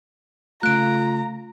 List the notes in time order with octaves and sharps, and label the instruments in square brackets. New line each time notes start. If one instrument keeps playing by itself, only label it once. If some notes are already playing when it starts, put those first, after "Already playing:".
[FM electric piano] C#3 A3 [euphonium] F4 [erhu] A#5 [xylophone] F#6 D7